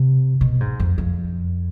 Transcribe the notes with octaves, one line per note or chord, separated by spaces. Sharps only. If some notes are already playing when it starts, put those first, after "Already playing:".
Already playing: C3
B2
G#2
F2
F2